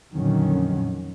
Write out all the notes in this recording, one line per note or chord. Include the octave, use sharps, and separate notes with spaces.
F2 A#2 D3 D#3 F#3 C#4